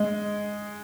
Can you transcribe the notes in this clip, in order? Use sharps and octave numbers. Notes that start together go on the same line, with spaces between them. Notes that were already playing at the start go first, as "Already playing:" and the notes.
Already playing: G#3